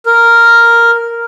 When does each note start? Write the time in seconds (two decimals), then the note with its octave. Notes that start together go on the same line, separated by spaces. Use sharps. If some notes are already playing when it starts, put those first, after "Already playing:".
0.06 A#4